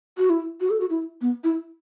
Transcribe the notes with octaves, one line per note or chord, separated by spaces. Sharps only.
F#4
E4
F#4
A4
F#4
E4
B3
E4